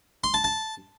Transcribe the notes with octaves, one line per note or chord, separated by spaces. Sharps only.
C6
A5
A5